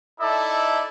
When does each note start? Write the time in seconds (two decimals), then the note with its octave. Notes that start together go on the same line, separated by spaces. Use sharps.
0.20 D#4 E4 A4 D5 E5